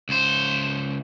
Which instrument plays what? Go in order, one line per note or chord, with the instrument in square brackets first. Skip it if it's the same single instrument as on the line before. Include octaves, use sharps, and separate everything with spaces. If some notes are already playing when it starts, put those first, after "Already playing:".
[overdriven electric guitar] C#2 C5